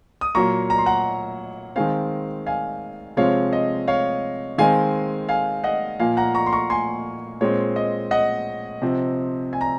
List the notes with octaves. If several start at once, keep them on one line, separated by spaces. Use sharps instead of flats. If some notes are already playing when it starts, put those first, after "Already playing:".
D#6
A#2 F#3 A#3 A#5 C#6
A#5
C6
F#5 A#5
D#3 G#3 C4 F5 G#5
F5 G#5
C3 F3 G#3 C4 C#5 F5
D#5
C#5 F5
D#3 G#3 C4 F5 G#5
F5 G#5
D#5 F#5
A#2 F3 A#3 F5 G#5
F#5 A#5
A#5 C#6
C6
A#5 C#6
G#5 C6
A#2 G#3 C4 C#5
D#5
D#5 F#5
C3 F3 C4
G#5
A#5